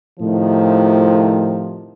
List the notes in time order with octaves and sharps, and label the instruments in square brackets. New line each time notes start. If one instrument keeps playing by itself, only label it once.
[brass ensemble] A2 C3 D#3 F3